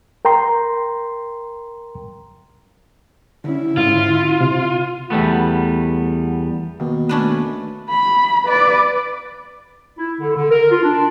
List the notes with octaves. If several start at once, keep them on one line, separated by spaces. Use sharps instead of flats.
A#4 G5 A#5 C6
D3 C#4 E4
G#2 D3 C#4 F4
C3
E2 G3 A3 B3
D#2 B2
A3 C#4 D4 B4
B5
B4 D5
E4
D3
D3
A#4
F4
D4